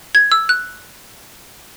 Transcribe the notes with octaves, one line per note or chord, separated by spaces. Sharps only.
G#6
E6
F#6